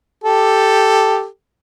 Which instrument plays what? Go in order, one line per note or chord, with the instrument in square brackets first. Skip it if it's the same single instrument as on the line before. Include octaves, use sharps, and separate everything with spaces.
[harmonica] G4 A4